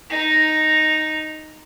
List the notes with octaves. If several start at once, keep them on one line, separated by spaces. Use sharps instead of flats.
D#4 A#5